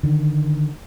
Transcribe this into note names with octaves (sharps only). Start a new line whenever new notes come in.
D3 D#3